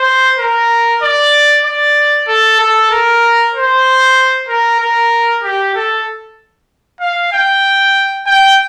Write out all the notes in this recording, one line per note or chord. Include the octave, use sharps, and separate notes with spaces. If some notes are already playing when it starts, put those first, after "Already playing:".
Already playing: C5
A#4
D5
D5
A4
A4
A#4
C5
A#4
A#4
G4
A4
F5
G5
G5